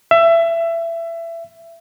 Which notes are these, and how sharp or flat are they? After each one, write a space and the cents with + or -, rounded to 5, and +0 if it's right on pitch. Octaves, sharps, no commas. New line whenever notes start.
E5 +20